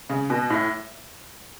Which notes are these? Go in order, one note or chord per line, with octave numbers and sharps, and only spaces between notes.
C#3
B2
A2